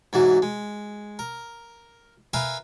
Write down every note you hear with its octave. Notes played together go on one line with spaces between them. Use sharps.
G#2 E3 F#3 F#4
G#3
A#4
A#4 B4 E5 F5 G#5 B5